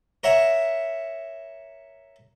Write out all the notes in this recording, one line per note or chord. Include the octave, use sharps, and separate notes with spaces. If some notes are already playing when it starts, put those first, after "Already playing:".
A#4 C#5 E5 F#5